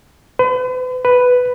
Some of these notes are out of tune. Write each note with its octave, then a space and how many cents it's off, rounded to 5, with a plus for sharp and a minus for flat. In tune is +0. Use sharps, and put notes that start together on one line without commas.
B4 +40
B4 +5